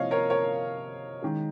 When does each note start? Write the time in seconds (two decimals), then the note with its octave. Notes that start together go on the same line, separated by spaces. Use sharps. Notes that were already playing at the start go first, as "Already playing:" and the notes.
Already playing: C3 F3 A#3 C#5 D#5 F5
0.11 A#4 C#5
0.30 A#4 C#5
1.22 D#3 G#3